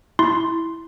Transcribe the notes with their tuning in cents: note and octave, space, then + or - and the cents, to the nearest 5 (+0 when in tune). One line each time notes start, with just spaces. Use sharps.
E4 -5 C6 +0